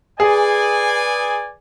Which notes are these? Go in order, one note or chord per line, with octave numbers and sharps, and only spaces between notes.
G#4 B4 D5 G#5